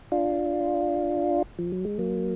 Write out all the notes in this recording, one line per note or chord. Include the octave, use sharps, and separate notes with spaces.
D4 F4
F3
F#3
G#3
F#3 A#3